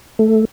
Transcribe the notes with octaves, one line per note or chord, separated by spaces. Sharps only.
A3